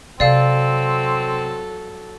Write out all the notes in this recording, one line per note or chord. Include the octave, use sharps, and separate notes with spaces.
C3 F#3 C4 A4 D5 F5